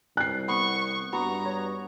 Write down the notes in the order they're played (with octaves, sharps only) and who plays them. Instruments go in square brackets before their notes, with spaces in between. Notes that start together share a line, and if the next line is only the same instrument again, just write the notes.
[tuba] C2 [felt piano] F#6 C7
[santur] B3 [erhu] C#6
[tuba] G2 [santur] B3 F#4 [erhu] A#5
[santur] C#5